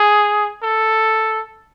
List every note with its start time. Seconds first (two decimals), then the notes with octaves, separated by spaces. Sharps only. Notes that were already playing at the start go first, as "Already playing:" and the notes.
Already playing: G#4
0.63 A4